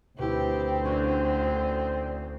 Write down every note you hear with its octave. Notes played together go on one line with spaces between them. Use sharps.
D2 B2 C4 E4 G4
D3 C#4 F#4